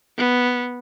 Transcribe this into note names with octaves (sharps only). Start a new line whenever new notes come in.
B3